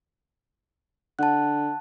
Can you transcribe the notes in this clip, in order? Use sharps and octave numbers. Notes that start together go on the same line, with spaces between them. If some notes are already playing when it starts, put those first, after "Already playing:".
D3 F#5 A5 F#6